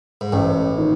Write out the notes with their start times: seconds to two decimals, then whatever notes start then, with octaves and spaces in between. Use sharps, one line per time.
0.21 G#2
0.32 A1 A2
0.78 D#3